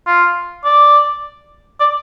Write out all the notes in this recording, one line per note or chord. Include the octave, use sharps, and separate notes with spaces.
F4
D5
D5